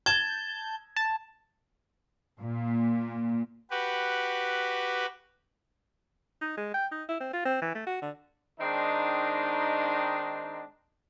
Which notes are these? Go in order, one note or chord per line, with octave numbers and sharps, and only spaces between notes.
A5 G6 G#6
A5
A#2
F#4 G4 B4
D#4
G#3
G5
D#4
E4
C4
F4
C4
E3
A3
F#4
D3
D#3 G#3 C4 D4 D#4